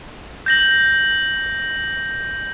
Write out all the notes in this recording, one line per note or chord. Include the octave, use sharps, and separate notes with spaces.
G6 A#6 F#7